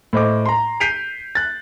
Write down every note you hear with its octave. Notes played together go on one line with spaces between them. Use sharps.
A2 C5 D#5 D6
A#5 C6
G6 B6 C7 D7 D#7 F7
F#6 A6